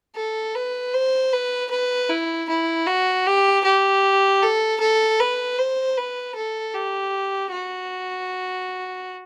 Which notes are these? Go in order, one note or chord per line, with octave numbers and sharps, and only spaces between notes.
A4
B4
C5
B4
B4
E4
E4
F#4
G4
G4
A4
A4
B4
C5
B4
A4
G4
F#4